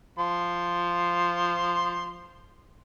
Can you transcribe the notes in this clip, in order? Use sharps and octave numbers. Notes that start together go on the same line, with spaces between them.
F3 C6